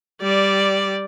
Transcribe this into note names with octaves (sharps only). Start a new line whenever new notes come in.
G3 D5